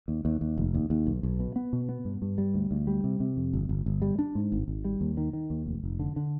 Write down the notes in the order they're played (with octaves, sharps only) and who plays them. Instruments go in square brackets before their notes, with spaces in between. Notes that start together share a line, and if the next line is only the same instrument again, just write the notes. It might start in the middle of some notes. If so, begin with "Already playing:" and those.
[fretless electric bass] D#2
D#2
D#2
F1
D#2
D#2
B1
B1
B2
B3
B2
B3
G2
G2
G3
D2
D2
G3
C3
C3
F2
G1
G1
G1
G3
D4
G#2
G#1
G#1
G3
D#2
D#3
D#3
D#2
F1
F1
D3
D3